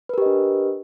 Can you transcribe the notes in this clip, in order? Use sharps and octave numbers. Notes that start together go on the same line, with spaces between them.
D4 G4 A#4 B4 D#5